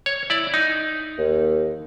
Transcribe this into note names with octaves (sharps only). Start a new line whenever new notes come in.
C#5
E4 D5
D#4
D#2